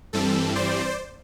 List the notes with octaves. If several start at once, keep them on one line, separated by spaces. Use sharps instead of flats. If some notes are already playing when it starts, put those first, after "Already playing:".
G2 E3 G3 C4 A4
C5 D5